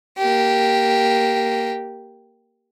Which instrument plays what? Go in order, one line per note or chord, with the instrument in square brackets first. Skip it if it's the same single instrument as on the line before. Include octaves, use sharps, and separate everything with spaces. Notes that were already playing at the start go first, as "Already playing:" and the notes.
[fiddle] A#3 G4